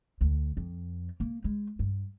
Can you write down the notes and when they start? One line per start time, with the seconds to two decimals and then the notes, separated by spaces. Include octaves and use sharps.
0.21 D2
0.57 F2
1.20 A#3
1.44 G#3
1.79 G2